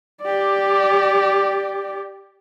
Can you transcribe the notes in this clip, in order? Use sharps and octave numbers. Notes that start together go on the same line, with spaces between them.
G4 D5